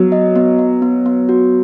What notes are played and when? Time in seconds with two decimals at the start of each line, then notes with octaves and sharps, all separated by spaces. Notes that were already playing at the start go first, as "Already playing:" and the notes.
Already playing: F#3 B3
0.12 D#5
0.36 B3
0.59 B3
0.82 B3
1.06 B3
1.29 F#4